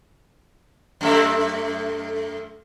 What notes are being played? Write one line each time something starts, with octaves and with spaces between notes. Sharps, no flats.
F#2 A3 E5